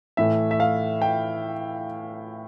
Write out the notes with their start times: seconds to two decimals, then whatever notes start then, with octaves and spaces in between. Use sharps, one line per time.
0.17 A2 E3 A3 E5
0.51 E5
0.60 F5
1.02 G5